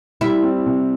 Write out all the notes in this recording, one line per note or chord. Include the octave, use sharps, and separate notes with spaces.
G3 E4
C4
C3